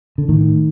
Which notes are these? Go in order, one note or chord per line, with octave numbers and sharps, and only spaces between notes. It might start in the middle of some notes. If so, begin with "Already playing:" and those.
D3
A2 D#3